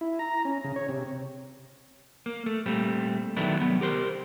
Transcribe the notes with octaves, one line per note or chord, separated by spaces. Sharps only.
E4
A#5
C#4
C#3
C#5
C3
A#3
A3
A#2 G3 A3 C4
D#3 F#3 A3 B3 D4 E4
C2 F#2 F#3 B3
G4 A#4 C5